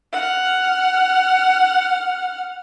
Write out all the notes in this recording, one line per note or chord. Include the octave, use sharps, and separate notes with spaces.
F#5 F6